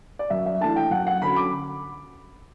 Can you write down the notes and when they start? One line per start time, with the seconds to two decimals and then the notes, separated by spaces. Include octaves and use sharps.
0.19 D5
0.30 F#2 E5
0.46 E5
0.61 E3 A3 D4 A5
0.76 G5
0.91 F#2 F#5
1.07 F#5
1.22 D3 F#3 C#4 B5
1.36 D6